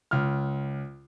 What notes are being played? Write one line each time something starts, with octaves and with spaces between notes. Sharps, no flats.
C#2 F6